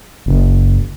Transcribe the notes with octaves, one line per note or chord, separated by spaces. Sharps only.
F#1